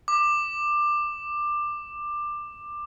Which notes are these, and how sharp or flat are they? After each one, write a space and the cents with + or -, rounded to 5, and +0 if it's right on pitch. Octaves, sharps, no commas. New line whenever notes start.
D6 +15